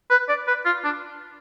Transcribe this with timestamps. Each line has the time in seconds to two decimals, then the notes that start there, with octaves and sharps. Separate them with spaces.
0.10 B4
0.29 D5
0.48 B4
0.65 F4
0.84 D4